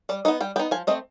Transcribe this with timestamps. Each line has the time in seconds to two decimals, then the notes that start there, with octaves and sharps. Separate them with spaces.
0.09 G3 D5
0.25 B3 D#4 D#5
0.40 G3 G5
0.56 B3 D#4 G5
0.71 F3 G#5
0.87 A3 C4 D#5